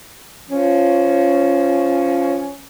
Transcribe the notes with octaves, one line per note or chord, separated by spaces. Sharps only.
F3 C#4